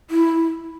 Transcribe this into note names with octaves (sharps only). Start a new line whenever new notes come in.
E4